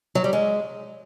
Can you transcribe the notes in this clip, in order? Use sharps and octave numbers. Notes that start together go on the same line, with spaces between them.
F#3
G3
G#3